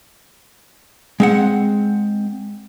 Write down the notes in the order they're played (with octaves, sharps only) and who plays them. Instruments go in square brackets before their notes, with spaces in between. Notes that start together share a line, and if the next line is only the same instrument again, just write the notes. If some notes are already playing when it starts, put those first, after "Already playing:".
[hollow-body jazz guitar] G#3 C4 F#5